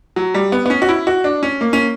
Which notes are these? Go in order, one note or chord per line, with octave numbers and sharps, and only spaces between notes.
F#3
G3
B3
B3
C#4
F#4
E4
F#4
D4
C#4
A#3
C#4